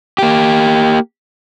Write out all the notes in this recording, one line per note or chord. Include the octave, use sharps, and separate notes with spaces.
A#3 G4